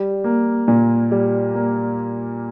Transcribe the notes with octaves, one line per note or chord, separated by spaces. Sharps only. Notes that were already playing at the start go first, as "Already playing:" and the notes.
Already playing: G3
A#3
A#2
G3
A#3